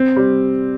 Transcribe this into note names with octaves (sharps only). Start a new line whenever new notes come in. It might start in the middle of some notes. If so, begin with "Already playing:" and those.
Already playing: C4
G3